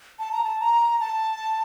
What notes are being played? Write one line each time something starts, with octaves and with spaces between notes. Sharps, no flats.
A5
A#5
A5
A#5
A5